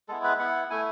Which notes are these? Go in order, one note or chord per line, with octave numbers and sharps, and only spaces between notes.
G#3 B3 E4 A4
B4
B3 E4 F#5
A3 E4 G#5